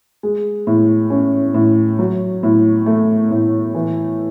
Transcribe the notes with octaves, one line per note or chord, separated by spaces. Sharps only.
G#3
A2
C#4
A2
F#3
A2
A3
A2
E3